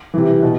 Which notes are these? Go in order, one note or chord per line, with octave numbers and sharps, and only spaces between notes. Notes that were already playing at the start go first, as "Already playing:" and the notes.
C3 E3
B2